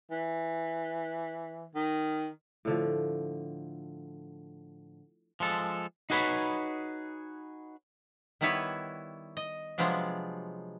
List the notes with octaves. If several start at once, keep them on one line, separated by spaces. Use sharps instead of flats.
E3
D#3
A2 D3 F3
F3 G#3 A4
D#4 F#4 G#4 B4 C#5 B5
D#3 G3 B3 E4 B4 C#5
D#5
C3 F3 F#3 G#3 B3 D4